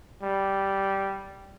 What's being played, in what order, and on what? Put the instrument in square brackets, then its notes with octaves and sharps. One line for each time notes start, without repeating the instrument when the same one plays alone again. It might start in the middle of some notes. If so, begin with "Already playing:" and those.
[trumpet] G3